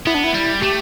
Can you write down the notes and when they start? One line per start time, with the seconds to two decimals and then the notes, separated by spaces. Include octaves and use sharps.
0.06 B3 E4
0.14 D4
0.24 E4
0.34 G3
0.62 A3 G4